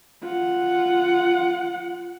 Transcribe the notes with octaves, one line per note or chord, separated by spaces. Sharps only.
F4 F#5